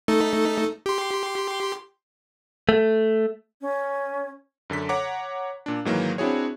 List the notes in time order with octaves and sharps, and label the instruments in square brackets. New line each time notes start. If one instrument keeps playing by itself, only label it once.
[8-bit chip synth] A3 D#4 A4
G4 C6
[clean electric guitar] A3
[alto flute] C#4
[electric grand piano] F#2 D3 A4 B6
C#5 F#5 A#5 D6
A#2 D4
G#2 D#3 E3 F#3 A#3
C4 D4 E4 F#4 G#4 C#5